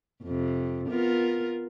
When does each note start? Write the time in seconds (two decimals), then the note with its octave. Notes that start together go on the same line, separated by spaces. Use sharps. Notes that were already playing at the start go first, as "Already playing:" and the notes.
0.24 F2 C3
0.89 B3 F4 A#4